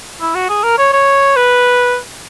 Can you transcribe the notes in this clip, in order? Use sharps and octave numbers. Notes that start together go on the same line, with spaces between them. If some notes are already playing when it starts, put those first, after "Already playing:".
E4
F#4
G#4
A#4
C#5
C#5
B4